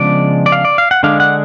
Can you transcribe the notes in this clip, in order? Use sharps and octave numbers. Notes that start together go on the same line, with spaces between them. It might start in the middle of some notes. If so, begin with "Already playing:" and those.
Already playing: C#3 F3 G#3 B3 D4 D5
D5
F5
D5
F5
F#5
D3 G#3 D4 F5
F#5